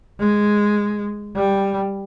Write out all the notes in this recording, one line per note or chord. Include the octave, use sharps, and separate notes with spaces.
G#3
G3